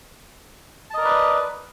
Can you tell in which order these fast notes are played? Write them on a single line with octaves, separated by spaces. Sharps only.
A5 D#5 A#4 D5 B4